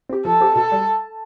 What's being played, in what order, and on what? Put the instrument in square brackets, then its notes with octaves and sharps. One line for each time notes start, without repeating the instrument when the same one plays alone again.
[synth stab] C4 G4
[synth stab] F3 [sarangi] A4
[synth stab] C4 G4
[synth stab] B2 [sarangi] A4
[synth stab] G3